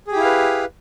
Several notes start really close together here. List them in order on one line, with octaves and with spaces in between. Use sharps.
G#4 G4 E4 F5 B4